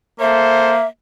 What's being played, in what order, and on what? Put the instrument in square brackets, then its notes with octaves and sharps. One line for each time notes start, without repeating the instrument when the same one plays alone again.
[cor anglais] A#3 [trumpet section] A4 C5 [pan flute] E5